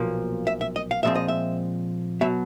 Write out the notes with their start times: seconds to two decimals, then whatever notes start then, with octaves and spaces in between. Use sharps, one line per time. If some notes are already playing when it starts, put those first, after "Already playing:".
Already playing: B1 A#2 F3 A#3
0.47 E5
0.61 E5
0.76 D#5
0.91 F5
1.03 A#2 F3 G#3 C4 E5
1.15 D#5
1.28 E5
2.21 B2 F#3 E5